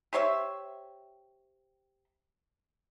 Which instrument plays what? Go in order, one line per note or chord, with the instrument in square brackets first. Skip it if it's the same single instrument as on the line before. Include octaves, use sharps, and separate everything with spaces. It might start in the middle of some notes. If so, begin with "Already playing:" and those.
[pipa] G4 C5 C#5 E5